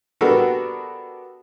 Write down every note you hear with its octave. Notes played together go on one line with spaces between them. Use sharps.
B3 D4 F#4 G4 A4 A#4